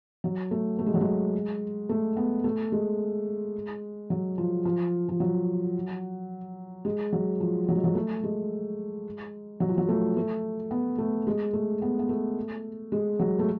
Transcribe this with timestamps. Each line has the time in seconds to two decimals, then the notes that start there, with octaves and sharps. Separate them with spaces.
0.24 F#3
0.51 A3
0.79 A3
0.86 G#3
0.94 F#3
1.01 G#3
1.89 A3
2.17 B3
2.44 A3
2.72 G#3
4.10 F#3
4.38 F3
4.65 F3
5.09 F3
5.20 F#3
6.85 G#3
7.13 F#3
7.40 F3
7.69 F#3
7.76 G#3
7.84 F#3
7.95 A3
8.24 G#3
9.60 F#3
9.69 F3
9.78 F#3
9.89 A3
10.17 A3
10.71 B3
10.98 A3
11.27 G#3
11.53 A3
11.82 B3
11.99 B3
12.09 A3
12.92 G#3
13.19 F#3
13.39 A3